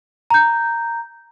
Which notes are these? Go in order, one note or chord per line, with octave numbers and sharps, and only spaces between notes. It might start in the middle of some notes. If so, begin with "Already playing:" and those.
A#5 G6